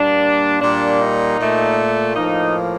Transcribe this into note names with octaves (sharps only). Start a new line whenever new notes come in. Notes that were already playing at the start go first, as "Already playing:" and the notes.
Already playing: A#2 G3 A#3 D4
A#2 G3 A#3 D4
D#4
A#2 A3
A2 F3 A#3 D#4